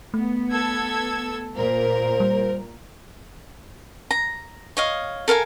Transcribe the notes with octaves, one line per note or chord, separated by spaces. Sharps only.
A3 B3
A4 E6 G#6
A#2 A#4 C5
G3
A#5
C#5 D#5 F5
A4 A#4 F5 G#5